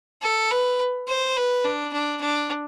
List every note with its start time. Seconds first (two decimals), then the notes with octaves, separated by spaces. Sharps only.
0.22 A4
0.51 B4
1.08 C5
1.36 B4
1.64 D4
1.93 D4
2.21 D4